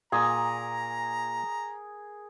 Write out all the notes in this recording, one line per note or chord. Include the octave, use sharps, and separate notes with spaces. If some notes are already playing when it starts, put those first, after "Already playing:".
A#2 G#4 A#4 A#5